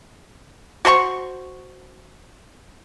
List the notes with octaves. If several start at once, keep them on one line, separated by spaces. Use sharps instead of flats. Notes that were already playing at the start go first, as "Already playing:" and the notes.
F#4 C5 A#5 C#6